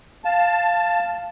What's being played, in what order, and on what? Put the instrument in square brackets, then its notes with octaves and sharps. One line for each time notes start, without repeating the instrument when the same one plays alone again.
[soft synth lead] F5 [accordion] A5